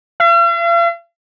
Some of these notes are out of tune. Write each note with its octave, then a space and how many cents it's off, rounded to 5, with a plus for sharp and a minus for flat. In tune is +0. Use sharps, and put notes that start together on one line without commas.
F5 -45